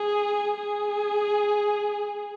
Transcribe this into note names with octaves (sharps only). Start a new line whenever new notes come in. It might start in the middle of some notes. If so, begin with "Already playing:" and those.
Already playing: G#4
G#4